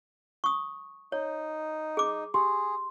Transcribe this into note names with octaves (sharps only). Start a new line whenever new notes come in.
C#6 D#6
D#4 C#5
G#4 D6
G4 G#4 C6